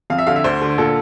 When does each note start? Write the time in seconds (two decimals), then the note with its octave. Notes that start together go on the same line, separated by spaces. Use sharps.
0.10 F2 F5
0.18 E5
0.27 D3 F5
0.36 E5
0.44 D2 C5
0.62 D3
0.78 A#2 A4